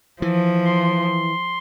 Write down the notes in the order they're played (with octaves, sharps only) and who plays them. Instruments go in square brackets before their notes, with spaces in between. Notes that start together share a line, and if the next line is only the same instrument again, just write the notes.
[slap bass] E3 [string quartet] F3
[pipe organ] C6